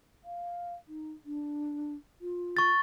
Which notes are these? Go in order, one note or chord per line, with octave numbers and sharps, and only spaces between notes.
F5
D#4
D4
F4
C#6 A6